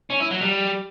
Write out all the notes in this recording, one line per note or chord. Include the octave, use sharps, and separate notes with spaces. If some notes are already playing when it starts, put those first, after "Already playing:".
C#4
E4
F#3
G3